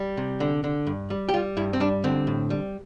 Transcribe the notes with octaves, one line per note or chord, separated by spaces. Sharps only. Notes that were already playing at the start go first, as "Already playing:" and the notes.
Already playing: G3
C3
D3
D3
G2
G3
G4
G3 F4
G2 E4
C4
G3 D4
D3 C4
A2
G3